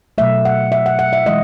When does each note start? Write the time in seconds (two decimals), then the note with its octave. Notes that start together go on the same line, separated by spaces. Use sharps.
0.18 B2 F#3 A3 E5
0.45 F#5
0.72 E5
0.86 F#5
0.99 F#5
1.13 E5
1.26 E3 G#3 D#5